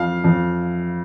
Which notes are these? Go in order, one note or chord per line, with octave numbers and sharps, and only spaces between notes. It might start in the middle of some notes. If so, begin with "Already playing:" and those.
Already playing: F2 F5
F2